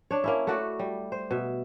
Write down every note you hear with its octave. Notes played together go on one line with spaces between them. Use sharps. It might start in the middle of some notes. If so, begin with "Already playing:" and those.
D4 C#5
A#3 C#4 E4
A3 F#4 D5
G3
C5
B2 E5